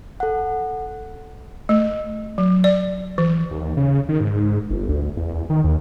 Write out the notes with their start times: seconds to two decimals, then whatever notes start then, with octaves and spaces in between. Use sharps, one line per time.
0.20 A4 F#5
1.69 A3
2.38 F#3
2.64 D5
3.18 E3
3.51 D#2
3.77 C#3
4.09 D#3
4.20 G#2
4.40 G#2
4.70 G1
4.89 D2
5.17 E2
5.50 D#3
5.64 D#2